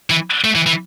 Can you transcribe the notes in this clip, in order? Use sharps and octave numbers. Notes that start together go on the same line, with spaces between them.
E3
A3
E3
E3